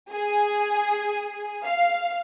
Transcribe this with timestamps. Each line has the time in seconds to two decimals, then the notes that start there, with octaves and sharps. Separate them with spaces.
0.12 G#4
1.66 F5